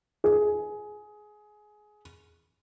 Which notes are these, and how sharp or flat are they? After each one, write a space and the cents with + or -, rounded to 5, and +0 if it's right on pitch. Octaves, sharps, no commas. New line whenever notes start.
G#4 +15